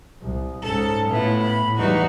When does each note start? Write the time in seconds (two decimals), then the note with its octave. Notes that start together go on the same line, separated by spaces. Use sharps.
0.22 C2
0.63 G#2 C#4 A4
1.10 A2 B3 E4 F4
1.44 B5
1.78 E2 E3 G3 D#4 F#4